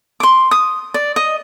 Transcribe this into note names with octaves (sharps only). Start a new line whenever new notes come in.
C6 D6
D#6
D5
D#5